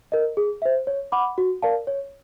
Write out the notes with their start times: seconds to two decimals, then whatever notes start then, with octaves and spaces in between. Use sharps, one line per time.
0.12 A#4 D#5
0.37 G#4
0.62 C5 E5
0.87 C#5
1.12 F#5 B5 D6
1.38 F#4
1.62 A#4 D5 F5 A5
1.87 C#5